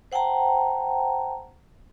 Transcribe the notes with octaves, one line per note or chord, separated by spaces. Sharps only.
C5 F#5 G5 A5 A#5